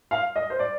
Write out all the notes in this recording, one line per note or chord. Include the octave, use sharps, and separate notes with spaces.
F5
D#5
C5
D5